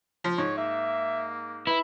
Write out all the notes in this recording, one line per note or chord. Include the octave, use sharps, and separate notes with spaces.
F3
G#2 C#5
A#3 E5
E4 B4